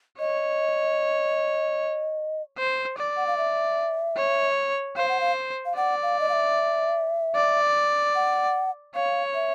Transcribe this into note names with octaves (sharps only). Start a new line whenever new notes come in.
C#5 D#5
C5
D5
F#5
F5
E5
C#5
C5 F5
F#5
F5
F5
D5 F#5
F5
D#5
F5
E5
D5
F#5
C#5 F5
E5